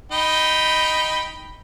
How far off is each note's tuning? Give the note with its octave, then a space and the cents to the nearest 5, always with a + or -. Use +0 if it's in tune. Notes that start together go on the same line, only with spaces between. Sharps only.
D#4 +0 G5 +0 B5 +0